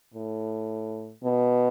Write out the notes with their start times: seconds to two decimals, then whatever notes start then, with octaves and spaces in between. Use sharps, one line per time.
0.14 A2
1.24 B2